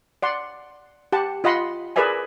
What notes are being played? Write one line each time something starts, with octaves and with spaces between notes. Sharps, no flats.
D5 F#5 C6
G4 F#5 A5
F4 D#5 F#5 B5 C6
G#4 A#4 B4 D5 E5 G#5